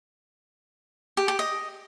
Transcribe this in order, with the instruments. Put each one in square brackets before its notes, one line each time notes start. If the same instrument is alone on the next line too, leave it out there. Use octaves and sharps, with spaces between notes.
[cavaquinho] G4
G4
D#5